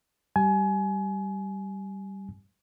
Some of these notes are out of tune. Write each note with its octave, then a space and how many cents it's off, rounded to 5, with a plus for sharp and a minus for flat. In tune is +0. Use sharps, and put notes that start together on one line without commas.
G3 -10 G#5 +25